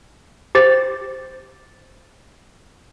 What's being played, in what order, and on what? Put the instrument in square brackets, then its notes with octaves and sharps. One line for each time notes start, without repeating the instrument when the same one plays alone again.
[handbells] G4 C5 A6